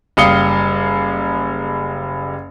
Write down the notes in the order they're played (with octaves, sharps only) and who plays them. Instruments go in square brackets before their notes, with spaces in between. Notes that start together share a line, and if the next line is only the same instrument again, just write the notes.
[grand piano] F#1 G3 F5 D#6 C#7 G7